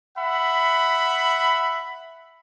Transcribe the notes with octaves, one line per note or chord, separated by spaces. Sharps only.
E5 F#5 B5